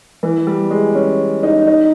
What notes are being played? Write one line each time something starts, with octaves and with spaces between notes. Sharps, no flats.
E3
G3
G#3
C#4
D#4
D#4